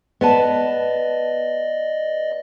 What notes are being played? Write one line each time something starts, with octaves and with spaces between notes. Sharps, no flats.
B3 B4 D5 D#5 A5